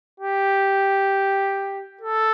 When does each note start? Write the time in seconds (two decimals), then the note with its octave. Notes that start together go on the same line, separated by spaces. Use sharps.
0.20 G4
2.01 A4